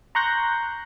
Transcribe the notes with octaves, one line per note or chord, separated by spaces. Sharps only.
A#5 C6 C#6 F#6 G6 A#6